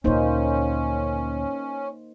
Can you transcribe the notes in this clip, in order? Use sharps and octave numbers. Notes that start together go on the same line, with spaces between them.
D2 A#2 A#3 C#4 D#4 C5